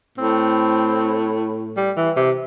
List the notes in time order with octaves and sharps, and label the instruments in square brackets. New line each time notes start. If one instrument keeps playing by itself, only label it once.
[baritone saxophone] A2 [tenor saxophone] C4
[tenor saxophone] G3
E3
C3